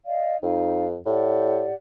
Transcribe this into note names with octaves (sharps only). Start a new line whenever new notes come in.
D5 D#5 F5
F2 D#4 F5
A2 G4 D5 F#5